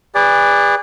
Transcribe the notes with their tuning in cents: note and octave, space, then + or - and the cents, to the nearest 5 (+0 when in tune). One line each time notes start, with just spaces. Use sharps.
G#4 -35 B4 +0 D5 -5